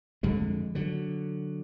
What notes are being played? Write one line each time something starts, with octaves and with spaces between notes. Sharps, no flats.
F2 D3 G#3
D3 F#3